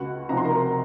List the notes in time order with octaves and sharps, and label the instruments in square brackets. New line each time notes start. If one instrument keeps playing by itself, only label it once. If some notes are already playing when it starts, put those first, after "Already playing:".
Already playing: [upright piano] C#2 F#4 F#5
C3 F3 C4 D#4 A#5
C6
A#4 A#5